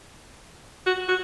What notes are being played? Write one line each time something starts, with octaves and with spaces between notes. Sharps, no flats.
F#4
F#4